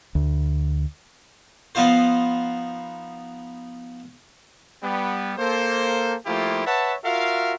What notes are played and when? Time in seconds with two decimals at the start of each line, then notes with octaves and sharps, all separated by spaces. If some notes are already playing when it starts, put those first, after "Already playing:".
0.15 D2
1.75 F3 B3 D#4 F4 C5
4.83 G3 B3
5.38 A#3 A4 C5
6.26 F3 A3 A#3 E4 F4 G4
6.66 B4 C#5 E5 F#5 A5
7.04 F4 F#4 A#4 E5 F5